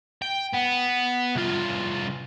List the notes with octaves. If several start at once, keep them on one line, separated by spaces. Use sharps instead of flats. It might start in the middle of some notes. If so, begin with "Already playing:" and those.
G5
B3
C2 F4